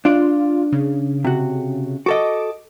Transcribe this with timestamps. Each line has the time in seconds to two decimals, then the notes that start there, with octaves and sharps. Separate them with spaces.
0.05 D4 F4 D5
0.72 C#3
1.25 C3 F#4
2.06 F#4 A4 D#5 D6